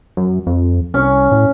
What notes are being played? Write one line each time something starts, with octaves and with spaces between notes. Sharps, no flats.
F#2
F2
C2 C#4
A2